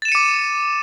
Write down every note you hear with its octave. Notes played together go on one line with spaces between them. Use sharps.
D6 A6 C#7 D#7 E7